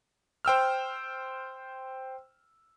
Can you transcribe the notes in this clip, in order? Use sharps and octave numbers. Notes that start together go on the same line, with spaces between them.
C5 G5 E6 F6